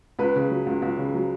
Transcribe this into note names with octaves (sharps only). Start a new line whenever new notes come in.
C#2 B4
C#3
F#3
C#2
C#2
C#3
F#3